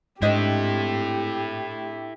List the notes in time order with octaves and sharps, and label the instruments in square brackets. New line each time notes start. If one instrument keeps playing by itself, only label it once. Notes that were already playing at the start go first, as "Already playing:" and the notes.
[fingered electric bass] G#2 [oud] C4 D4 D#5 [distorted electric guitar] E4 A4 [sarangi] G4